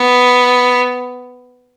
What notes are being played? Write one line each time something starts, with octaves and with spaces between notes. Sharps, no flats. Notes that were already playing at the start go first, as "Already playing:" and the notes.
Already playing: B3